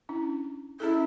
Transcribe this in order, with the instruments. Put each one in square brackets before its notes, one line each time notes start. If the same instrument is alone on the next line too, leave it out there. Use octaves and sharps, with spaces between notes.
[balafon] C#4 D4 E4
[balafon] C#4 G#4 A4 [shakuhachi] E4